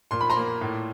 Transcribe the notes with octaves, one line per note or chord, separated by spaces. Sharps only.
A#2 C6
B5
A#5 C6
A#3
A2